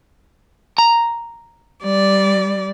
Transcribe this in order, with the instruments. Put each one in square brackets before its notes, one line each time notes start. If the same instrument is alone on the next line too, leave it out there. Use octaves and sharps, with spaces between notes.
[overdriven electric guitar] A#5
[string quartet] G3 D5